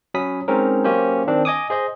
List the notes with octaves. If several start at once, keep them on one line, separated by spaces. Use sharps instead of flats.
F#3 C#4 B5 D#6 B6
G#3 C4 C#4 D#4 A#4
F#3 A#3 C#4 G4 C5
D#3 C4 D4
D#5 G#5 D6 D#6
G#4 C5 D#5